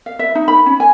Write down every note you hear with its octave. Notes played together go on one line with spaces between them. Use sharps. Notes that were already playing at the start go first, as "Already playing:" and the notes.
F5
E5
D#4
B5
C#4
G#5